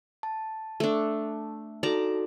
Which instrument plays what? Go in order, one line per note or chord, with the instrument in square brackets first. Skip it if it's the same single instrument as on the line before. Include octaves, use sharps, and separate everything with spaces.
[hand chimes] A5
[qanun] A3 D4
[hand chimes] D#4 F#4 A4 [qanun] D5 A5 A#5